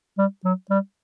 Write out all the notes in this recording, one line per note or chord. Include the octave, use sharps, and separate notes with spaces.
G3
F#3
G3